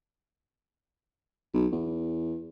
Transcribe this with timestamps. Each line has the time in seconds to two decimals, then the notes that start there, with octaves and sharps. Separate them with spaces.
1.54 B1
1.72 E2